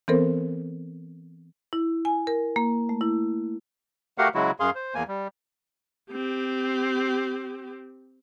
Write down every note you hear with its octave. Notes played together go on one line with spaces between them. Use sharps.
E3 B3 C4 A4 A#4 C5
E4
G#5
A#4
A#3
A3
E4
A3 F#4 G4 A#4 F5 F#5
C#3 F#3 G#3 E4 F#4
F#2 G#4 F5 C6
C5
E2 A#3 G#5
G3
C4 G4